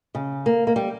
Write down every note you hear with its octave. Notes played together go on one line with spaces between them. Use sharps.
C#3
A#3
A#3
G3